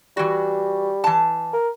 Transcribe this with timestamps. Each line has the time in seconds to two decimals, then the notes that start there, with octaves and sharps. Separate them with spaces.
0.17 E3 G3 F#4
1.04 E3 A5
1.53 A#4